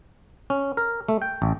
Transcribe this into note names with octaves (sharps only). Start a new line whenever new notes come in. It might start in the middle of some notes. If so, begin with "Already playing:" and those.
C#4
A#4
A3
G5
A1